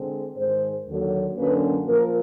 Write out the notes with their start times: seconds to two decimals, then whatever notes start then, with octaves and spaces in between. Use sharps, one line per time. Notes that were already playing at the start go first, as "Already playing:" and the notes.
Already playing: D3 G#3 C4
0.35 G#2 D#3 G#3 C5
0.86 D#2 D3 F#3
1.36 F#2 D3 F#3 A#3 C#4 B4
1.86 A#2 F3 A#3 A#4